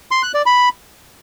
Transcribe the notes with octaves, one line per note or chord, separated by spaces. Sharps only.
C6
F#6
D5
B5